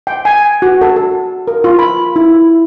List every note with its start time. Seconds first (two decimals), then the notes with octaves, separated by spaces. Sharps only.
0.07 G5
0.25 G#5
0.62 F#4
0.82 A4
0.96 A4
1.48 A#4
1.64 F4
1.79 B5
2.16 E4